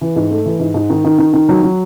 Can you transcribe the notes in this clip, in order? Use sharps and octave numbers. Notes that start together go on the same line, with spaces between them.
E3
G#2
A3
E3
G#2
G#2
D#3
D#3
D#3
D#3
F#3
F#3